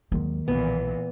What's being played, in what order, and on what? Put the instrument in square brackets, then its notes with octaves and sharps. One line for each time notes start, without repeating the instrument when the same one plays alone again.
[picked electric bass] D#2 F#3 G#3 [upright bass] D#3 A#3
[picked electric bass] B1 [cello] A#2 E3 [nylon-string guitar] B3